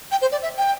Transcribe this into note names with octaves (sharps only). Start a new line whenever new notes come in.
G5
C5
D5
E5
G5